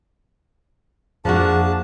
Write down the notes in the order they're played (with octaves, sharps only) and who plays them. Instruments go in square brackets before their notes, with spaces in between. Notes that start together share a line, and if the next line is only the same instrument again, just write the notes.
[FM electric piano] F2 [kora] F3 A#3 F#4 [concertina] D4 A5 [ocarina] G#4